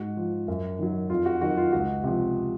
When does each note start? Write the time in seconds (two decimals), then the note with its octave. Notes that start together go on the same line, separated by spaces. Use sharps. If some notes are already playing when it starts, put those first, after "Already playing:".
Already playing: G#2 F#4
0.17 F3
0.48 F#2
0.79 D#3 F#3
1.10 F2 F4
1.26 F#4
1.41 D#3 F#3 F#4
1.57 F4
1.72 C#2 F#4
2.03 C3 F3